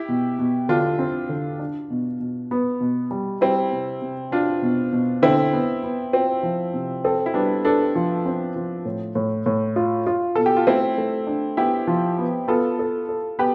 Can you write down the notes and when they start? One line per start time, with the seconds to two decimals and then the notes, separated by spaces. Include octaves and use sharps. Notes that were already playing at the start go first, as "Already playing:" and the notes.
Already playing: E4 G4
0.09 B2
0.39 B2
0.69 D3 D4 F4
0.99 C4
1.29 D3
1.59 D4
1.90 B2
2.20 B2
2.51 B3
2.80 B2
3.11 G3
3.41 G3 C4 E4
3.72 C3
4.02 C3
4.32 C4 D4 F4
4.62 B2
4.93 B2
5.22 D3 C4 E4
5.53 B3
5.83 B3
6.13 C4 F4
6.43 F3
6.74 C3
7.04 C4 A4
7.26 E4
7.34 G3 B3 D4
7.65 B3 D4 A4
7.95 F3
8.26 C4
8.56 F3
8.85 A2
9.15 A2
9.46 A2
9.76 F4
10.07 F4
10.36 B2 A4
10.46 G4
10.57 F4
10.67 A3 C4 E4
10.98 A3
11.27 D4
11.57 B3 E4 G4
11.87 F3
12.18 B3
12.48 B3 F4 A4
12.79 A4
13.09 A4
13.39 B3 G4 B4